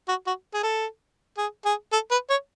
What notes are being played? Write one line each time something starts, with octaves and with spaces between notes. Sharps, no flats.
F#4
F#4
G#4
A4
G#4
G#4
A4
B4
C#5